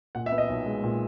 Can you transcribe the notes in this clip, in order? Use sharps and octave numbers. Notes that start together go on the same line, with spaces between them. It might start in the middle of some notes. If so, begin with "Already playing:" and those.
A#2 F#5
E5
B3
D#5
B1
G#3
A#2